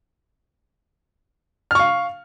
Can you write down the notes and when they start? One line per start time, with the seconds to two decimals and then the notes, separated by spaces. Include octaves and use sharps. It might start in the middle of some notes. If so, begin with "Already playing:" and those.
1.71 F6
1.75 C#6
1.79 F5